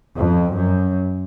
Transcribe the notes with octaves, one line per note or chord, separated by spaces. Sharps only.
F2
F#2